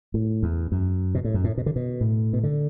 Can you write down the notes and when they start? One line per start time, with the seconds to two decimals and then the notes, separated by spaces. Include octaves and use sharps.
0.14 A2
0.43 E2
0.72 F#2
1.15 B2
1.24 A2
1.34 F#2
1.44 A2
1.58 B2
1.66 D3
1.76 B2
2.01 A2
2.33 B2
2.43 D3